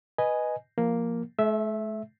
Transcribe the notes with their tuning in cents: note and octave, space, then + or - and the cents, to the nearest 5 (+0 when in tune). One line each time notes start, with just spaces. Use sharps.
B4 +0 D#5 +0 G#5 +0
F3 -10 A#3 +0
A3 -45 E5 +0